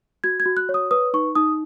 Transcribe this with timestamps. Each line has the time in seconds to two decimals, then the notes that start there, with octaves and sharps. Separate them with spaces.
0.24 F#4 G#6
0.40 G#6
0.46 F#4
0.57 F#6
0.69 C#5
0.74 D#6
0.91 B4 D#6
1.14 D#4 C#6
1.35 D#4 D#6